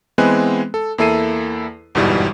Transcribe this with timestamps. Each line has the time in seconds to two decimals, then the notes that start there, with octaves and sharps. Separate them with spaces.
0.18 E3 G#3 B3 C4 G#5 F#6
0.74 A4
0.98 E2 A#3 E4 A4 C7 D#7
1.95 G1 E2 G#2 B2 E3 G3